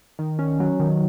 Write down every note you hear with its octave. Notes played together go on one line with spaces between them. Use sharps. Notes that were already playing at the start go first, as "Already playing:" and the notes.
D#3
C#4
F#3
D#3